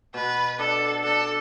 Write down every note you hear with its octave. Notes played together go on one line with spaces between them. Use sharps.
B2 B4
D4 A4
D4 A4